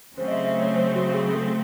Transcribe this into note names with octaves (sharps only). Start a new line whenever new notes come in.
C#3 F#3 A3 C4 C5
D#5
E5
E5
C#5
C5
F#4
G#4
A4